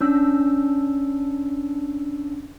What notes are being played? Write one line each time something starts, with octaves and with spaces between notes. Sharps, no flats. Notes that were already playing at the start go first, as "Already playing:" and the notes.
C#4 D4 E6